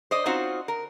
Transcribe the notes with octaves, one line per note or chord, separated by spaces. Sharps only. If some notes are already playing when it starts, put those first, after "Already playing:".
C5 D5 D#5
C4 C#4 D#4 F4 F#4 C5
A#4